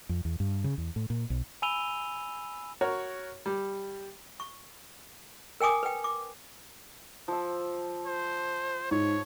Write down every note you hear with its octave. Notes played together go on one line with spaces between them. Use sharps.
F2
E2
G2
C#3
E2
A2
A#2
B1
G#5 B5 E6 D#7 F7 G7
F#4 A#4 C#5
G3
C#6
A#4 G5 G#5 D6 D#6
B4 G5
D6
F3 E6
C5
G#2 C#5